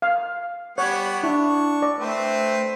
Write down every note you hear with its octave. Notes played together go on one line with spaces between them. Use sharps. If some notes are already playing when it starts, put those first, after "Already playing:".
F5
G3 B3 C#5 F#5
D4 E4 C#6
D5
A3 C4 B4 C5